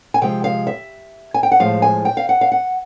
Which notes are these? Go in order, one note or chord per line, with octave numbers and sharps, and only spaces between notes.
G#5
C3 F3 G#3 G5
F5
E5
G#5
G5
F#5
A2 F3 G#3 F5
G#5
G5
F5
F#5
F5
F#5